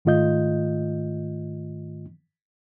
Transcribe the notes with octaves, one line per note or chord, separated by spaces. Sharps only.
G#2 D#3 A3 F4 D#5 G6